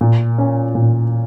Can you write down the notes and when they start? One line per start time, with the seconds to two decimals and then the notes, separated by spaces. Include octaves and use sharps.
0.01 A#2
0.38 C#4
0.75 A#2